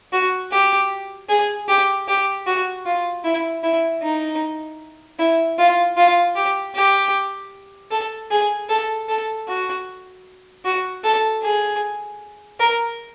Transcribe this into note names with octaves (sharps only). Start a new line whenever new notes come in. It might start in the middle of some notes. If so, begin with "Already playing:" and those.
F#4
G4
G#4
G4
G4
F#4
F4
E4
E4
D#4
E4
F4
F4
G4
G4
A4
G#4
A4
A4
F#4
F#4
A4
G#4
A#4